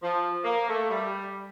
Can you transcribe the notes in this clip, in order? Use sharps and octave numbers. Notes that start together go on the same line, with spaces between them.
F3
A#3
A3
G3